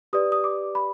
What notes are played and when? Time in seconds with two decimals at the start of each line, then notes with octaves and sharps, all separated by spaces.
0.13 G4 B4 D5 D#6
0.32 D#6
0.44 D6
0.75 B5